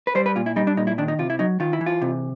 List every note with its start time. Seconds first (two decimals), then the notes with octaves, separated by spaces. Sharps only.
0.07 B4
0.15 G3 C5
0.26 B4
0.36 A#2 F4
0.46 E4
0.56 G3 D#4
0.67 D4
0.77 A#2 D#4
0.87 E4
0.98 D#3 D4
1.08 D#4
1.19 C3 F4
1.30 E4
1.39 F#3 D#4
1.60 D#3 F4
1.73 E4
1.81 E3
1.86 F4
2.02 C3